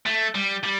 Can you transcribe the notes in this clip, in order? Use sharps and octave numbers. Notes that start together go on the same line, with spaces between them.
A3
G3
G3